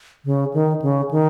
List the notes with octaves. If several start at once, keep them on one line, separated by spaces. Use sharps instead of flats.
C#3
D#3
C#3
D#3